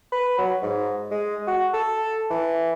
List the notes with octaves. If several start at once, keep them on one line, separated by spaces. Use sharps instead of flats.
B4
F#3
G#2
G#3
F#4
A4
E3